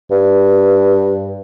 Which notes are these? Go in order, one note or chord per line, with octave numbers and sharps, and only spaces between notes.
G2